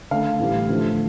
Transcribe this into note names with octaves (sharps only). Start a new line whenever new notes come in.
D3 A3 F5
A2 E3 G3
D3 F3 A3